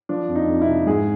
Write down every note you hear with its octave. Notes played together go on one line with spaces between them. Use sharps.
F3 D4
F2
D#4
F2
E4
C3
G#2 G#4